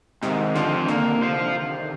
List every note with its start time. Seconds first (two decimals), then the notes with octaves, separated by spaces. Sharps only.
0.22 G#2 C3 D#3
0.55 D3 F3 C4 F4
0.88 D3 A#3
1.21 F4 C5 F5